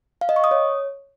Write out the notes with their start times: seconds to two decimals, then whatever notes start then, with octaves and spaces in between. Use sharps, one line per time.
0.21 F5
0.29 D#5
0.36 C#6
0.44 D#6
0.51 C#5